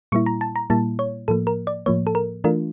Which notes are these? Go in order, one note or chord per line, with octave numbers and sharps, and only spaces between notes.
A#2 G3 A#3 E4 C#6
A#5
A5
A#5
A#2 G3 A#3 E4 A5
C#5
A2 F3 A#3 A4
A#4
D5
A2 F3 A#3 C#5
A4
A#4
E3 A3 D4 F4 A#4